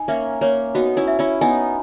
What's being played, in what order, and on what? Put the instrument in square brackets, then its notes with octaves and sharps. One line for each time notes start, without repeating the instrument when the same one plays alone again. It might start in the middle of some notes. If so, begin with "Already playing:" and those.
Already playing: [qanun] D#4 [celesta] G#5
[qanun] A#3 C#4 [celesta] E5
[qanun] A#3 C#4 [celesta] C#5
[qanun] B3 D#4 [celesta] F#4
[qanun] C#4 E4
[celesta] E5
[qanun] C#4 E4
[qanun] B3 D#4 [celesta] G#5